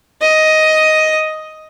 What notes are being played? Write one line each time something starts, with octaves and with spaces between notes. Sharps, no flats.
D#5